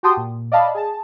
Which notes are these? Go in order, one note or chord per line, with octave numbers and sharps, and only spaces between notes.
F#4 G4 G5 A5 C6 D#6
A#2
D5 D#5 F5 A5 B5
G#4 A5